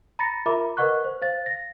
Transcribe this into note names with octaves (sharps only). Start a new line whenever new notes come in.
A#5 B5 A6 A#6 C#7
F4 A#4 E5 A#5 B5 D6
A#4 B4 D#5 F#5 C#6 F#6
C5
C5 F5 A6
A#6